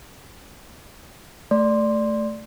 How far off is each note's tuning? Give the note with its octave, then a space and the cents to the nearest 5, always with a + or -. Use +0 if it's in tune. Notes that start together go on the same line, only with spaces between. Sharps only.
A3 +0 D5 +0 C6 +0